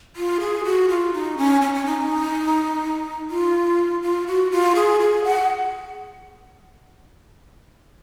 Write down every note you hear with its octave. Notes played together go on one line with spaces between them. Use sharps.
F4
G#4
F#4
F4
D#4
C#4
C#4
C#4
D#4
F4
F4
F#4
F4
G#4
G#4
F#5